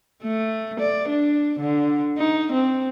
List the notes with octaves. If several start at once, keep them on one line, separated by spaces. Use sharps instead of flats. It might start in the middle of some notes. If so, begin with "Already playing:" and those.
A3
D5
D4
D3
D#4
C4